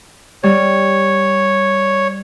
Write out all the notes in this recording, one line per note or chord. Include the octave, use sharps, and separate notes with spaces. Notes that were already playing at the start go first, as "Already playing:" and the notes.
G3 C#5